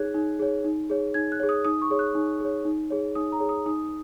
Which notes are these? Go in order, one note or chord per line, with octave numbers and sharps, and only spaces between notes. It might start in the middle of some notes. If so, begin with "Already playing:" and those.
Already playing: D#4 G#4 C#5 F#6 G#6
D#4
G#4 C#5
D#4
G#4 C#5
D#4 G#6
F#6
G#4 C#5
D#6
D#4 D#6
C#6
G#4 C#5
F#6
D#4
G#4 C#5
D#4
G#4 C#5
D#4 D#6
A#5
G#4 C#5
D#6
D#4 D#6